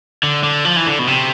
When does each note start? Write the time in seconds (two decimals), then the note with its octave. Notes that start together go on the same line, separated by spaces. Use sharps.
0.23 D3
0.44 D3
0.65 F3
0.76 E3
0.87 D3
0.99 B2
1.07 C3